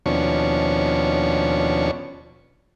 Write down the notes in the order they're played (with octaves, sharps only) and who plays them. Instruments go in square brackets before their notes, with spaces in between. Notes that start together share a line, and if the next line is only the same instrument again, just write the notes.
[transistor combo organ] D#2 B2 F3 C#4 D4 C#6